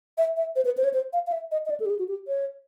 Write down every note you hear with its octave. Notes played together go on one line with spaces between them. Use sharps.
E5
E5
C5
B4
C5
C#5
C5
F5
F5
E5
D#5
D#5
D5
A4
G4
G#4
F#4
G4
C#5